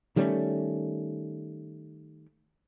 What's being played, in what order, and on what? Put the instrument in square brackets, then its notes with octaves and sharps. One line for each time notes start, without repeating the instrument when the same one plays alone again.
[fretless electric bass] D#3 G3 A3 C#4